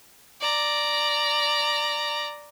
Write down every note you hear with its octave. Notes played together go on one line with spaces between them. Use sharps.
D5 A#5